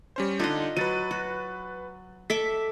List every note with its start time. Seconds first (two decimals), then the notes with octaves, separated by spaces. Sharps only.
0.16 G3 C#4 C5
0.40 D3 D4 D#4 F4 D#5
0.77 F#3 B4 A6 D#7
1.11 F#4
2.30 A4 E5 D6 B6